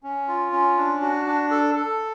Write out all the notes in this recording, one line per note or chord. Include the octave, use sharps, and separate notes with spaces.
C#4
F4
C#4
D4
F#4
D4
A4
A4